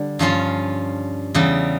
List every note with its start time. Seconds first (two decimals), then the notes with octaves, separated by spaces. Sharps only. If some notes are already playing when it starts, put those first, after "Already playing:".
Already playing: D3 G3
0.19 G2 F3 C#4 F4
1.34 E2 C#3 G3